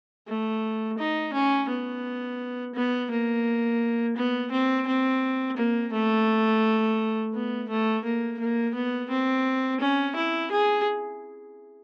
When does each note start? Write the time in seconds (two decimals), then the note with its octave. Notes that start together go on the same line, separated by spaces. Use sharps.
0.27 A3
0.98 D#4
1.33 C#4
1.69 B3
2.75 B3
3.11 A#3
4.17 B3
4.51 C4
4.87 C4
5.57 A#3
5.92 A3
7.34 B3
7.69 A3
8.04 A#3
8.39 A#3
8.75 B3
9.10 C4
9.80 C#4
10.16 E4
10.51 G#4